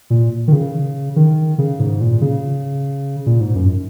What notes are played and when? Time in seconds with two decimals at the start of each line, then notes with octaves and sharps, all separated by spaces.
0.10 A#2
0.48 D#3
0.52 C#3
1.16 D#3
1.58 C#3
1.80 G#2
2.01 A#2
2.21 C#3
3.26 A#2
3.41 G#2
3.55 F#2